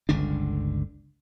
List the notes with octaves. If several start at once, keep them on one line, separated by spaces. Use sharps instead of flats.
G1 C#2 D3 D4